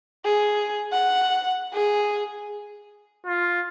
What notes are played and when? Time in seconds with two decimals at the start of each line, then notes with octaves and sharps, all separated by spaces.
0.25 G#4
0.92 F#5
1.73 G#4
3.26 F4